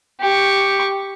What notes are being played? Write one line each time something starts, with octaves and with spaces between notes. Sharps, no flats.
G4 C#6